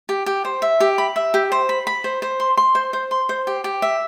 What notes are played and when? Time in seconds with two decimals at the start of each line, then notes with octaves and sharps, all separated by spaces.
0.09 G4
0.26 G4
0.45 C5
0.62 E5
0.80 G4
0.98 B5
1.16 E5
1.34 G4
1.52 C5
1.69 B5
1.87 B5
2.04 C5
2.22 C5
2.40 C6
2.57 C6
2.75 C5
2.93 C5
3.11 C6
3.29 C5
3.47 G4
3.64 G4
3.82 E5